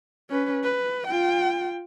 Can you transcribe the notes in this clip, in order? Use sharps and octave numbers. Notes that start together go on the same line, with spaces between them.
C#4 B4
B4
F4 G5